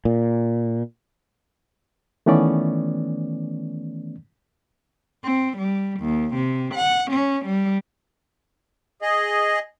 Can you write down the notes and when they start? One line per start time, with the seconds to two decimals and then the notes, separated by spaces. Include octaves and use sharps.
0.05 A#2
2.26 D#3 E3 A3 B3 C#4 D5
5.25 C4
5.57 G3
6.00 D#2
6.35 C3
6.75 F#5
7.11 C#4
7.45 G3
9.02 G#4 D#5